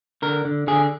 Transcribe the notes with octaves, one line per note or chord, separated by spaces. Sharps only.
D3 A#4
D3
D3 G#4